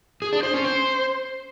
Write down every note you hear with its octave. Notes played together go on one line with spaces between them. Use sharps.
G#4
D4
C5
C#4
C5